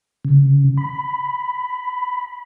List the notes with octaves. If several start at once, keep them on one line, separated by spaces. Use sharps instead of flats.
C#3
B5